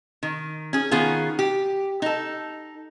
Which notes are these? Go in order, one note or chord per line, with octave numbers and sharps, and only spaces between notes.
D#3
C#4 G#4
D#3 B3 C#4 F4 G#4
G4
D#4 A4